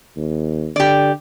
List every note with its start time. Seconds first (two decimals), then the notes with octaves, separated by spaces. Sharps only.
0.17 D#2
0.76 D3 G4 D5